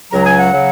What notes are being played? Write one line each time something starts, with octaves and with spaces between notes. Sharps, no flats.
C#2 C#3 F#3 A#5
G#5
F#5
C#3 F#3